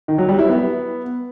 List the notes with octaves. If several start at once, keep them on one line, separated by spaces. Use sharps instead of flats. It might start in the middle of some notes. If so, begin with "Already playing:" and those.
D#3
F#3
G3
E4
B3